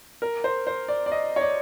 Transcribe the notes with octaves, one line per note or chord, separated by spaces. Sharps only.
A#4
C5
C5
D5
D5
D#5
C#5
D5